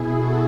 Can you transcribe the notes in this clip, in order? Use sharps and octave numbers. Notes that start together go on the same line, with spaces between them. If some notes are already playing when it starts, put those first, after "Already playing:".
Already playing: B2 E4 G#4
F#4 A4